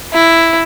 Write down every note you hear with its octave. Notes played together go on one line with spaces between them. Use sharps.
E4